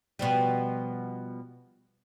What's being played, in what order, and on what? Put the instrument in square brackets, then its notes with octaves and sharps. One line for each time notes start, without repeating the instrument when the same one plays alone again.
[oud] B2 F3 G3